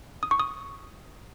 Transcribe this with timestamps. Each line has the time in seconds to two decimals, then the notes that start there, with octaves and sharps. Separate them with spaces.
0.23 D#6
0.31 C#6
0.40 D#6